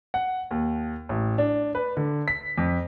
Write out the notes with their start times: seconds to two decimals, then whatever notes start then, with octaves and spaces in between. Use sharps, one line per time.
0.14 F#5
0.51 D#2
1.09 A1
1.38 D4
1.75 B4
1.97 D3
2.28 B6
2.58 F2